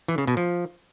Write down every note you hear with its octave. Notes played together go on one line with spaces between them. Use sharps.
E3
C#3
B2
F3